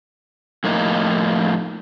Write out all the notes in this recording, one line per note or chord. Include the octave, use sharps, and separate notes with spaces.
F2 A2 A#3 D#4